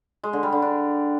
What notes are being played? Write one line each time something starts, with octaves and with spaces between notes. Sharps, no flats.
G#3
D3
G3
D3
D4